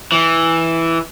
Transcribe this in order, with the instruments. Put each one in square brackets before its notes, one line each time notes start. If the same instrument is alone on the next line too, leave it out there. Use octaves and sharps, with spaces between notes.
[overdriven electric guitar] E3